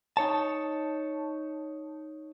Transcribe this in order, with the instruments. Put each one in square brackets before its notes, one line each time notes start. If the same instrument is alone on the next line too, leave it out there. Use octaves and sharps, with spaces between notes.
[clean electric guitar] D#4 C#5 A5